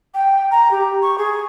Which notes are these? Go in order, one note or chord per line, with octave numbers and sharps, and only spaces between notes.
G5
A#5
G4
C#6
G#4